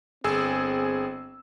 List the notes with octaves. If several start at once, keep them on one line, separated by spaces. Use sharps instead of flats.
G1 C4 G#4 E6